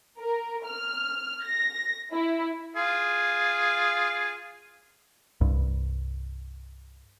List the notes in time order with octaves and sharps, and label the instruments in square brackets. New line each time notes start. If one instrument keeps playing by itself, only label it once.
[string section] A#4
F6
A#6
E4
[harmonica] F4 G#4
[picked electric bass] C2 G2